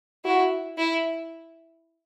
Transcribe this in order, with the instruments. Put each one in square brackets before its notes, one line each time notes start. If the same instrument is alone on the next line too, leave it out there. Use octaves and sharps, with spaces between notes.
[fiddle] E4 [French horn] F#4
[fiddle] E4